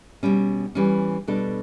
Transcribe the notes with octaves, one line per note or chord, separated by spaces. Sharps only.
B2 G3 C#4
E3 G3 C#4
B2 G3 D4 A4